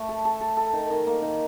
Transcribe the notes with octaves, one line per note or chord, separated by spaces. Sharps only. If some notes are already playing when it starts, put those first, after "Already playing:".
Already playing: A3
A4
A4
A4
A4
D#3
D#3
A#3
D#3